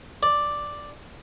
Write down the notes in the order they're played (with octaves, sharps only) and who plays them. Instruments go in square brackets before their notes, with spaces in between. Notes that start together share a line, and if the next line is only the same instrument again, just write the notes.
[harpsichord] D5